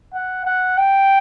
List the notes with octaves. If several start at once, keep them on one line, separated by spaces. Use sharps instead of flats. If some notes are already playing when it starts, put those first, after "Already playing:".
F#5
F#5
G5